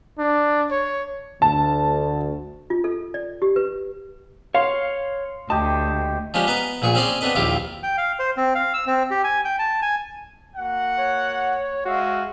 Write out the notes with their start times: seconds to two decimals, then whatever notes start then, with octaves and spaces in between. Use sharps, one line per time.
0.19 D4
0.71 C#5
1.42 D2 A5
2.70 F4
2.84 A4
3.14 D5
3.42 G4
3.56 B4
4.54 C#5 F5 C6
5.50 D2 G4 D#5 A5
6.34 F3 G#3 C#4 D4 G4
6.47 B3 B4 D#5 A#5
6.82 A#1 A#2 G#4 C#6
6.95 C4 C#4 G#4 C5 D5 D#6
7.21 B3 C4 D4 B4 D#5
7.35 A#1 D#2 E4 F4 G4 D6
7.83 G5
7.97 F5
8.19 C5
8.37 C4
8.55 F5
8.74 E6
8.87 C4
9.11 G4
9.24 G#5
9.45 G5
9.59 A5
9.82 G#5
10.57 A#3 F#4 F#5
10.99 C#5
11.86 G#3 F#4 E5 F5